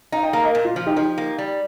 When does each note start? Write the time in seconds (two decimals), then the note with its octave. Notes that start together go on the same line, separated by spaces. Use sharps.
0.12 D#4 F5 A#5
0.23 D#5 G5
0.33 A#3 F5 A#5
0.44 A#4 D#5
0.55 A#2
0.65 F4
0.76 F3
0.86 D#4 G4
0.96 F3 D#4 G4
1.18 A#3
1.38 G3